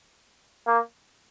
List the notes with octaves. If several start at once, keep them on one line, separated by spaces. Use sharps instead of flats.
A#3